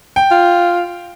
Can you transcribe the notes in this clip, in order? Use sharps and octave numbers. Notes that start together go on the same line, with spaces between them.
G5
F4